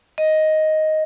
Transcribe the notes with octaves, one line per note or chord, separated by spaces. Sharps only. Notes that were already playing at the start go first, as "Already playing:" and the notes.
D#5